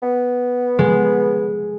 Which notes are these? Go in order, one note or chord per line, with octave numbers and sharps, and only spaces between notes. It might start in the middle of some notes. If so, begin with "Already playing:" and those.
B3
G#3